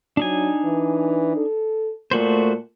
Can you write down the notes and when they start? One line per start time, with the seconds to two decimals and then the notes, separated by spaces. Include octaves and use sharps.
0.17 F#3 D4 D#4 G#5
0.65 E3
1.36 A4
2.11 A#2 A3 F#4 C5